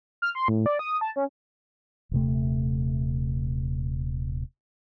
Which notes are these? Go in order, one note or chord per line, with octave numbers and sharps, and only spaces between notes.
F6
C6
A2
D5
D#6
A5
C#4
D#1 C3 A3